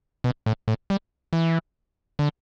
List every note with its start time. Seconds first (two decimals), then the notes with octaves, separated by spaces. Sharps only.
0.24 B2
0.46 A2
0.68 A2
0.90 G3
1.33 E3
2.19 D3